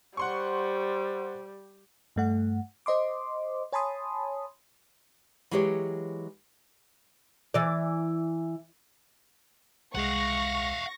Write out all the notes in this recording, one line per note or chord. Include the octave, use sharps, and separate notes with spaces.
G3 C5 F#5 C6 C#6
G2 A3 F#5
C5 D#5 C6 D6
C#5 G#5 A5 B5 C6 D#6
E3 F#3 G#3 G4 G#4 C#5
E3 D5
C2 G#3 F5 F#5 C#6 A#6